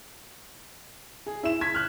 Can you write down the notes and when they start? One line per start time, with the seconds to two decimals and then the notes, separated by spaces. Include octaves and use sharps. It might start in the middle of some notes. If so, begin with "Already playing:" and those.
1.26 G#4
1.43 E4 E7
1.61 G#6 B6
1.74 F6 F#6